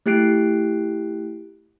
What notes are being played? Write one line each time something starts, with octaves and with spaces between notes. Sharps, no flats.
A3 E4 G4 F#6 C7 D7